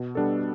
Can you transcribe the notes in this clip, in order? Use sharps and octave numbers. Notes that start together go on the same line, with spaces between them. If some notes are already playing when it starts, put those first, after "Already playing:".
Already playing: B2
G3 B3 D4 A4